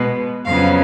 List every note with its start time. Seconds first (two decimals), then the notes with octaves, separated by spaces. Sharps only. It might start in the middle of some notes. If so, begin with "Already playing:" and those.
Already playing: B2 G#3 B3
0.46 F2 C#3 F#3 B3 F5